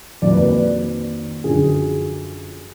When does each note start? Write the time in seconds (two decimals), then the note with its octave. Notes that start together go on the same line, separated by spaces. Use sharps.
0.22 F2 D#3 F#3 A#3 D5
0.32 B4
0.43 D5
1.44 F#2 D3 F3 G#4